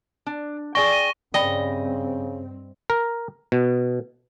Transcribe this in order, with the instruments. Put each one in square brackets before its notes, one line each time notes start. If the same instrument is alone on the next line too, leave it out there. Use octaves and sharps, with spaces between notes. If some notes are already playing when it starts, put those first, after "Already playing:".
[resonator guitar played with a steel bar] D4
[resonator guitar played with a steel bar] G#4 D5 G5 [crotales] C#6 A#6 G7
[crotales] D#7
[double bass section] G2 C4 [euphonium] C#3 [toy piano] D5 G5 B5 [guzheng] D#5
[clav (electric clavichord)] A#4
B2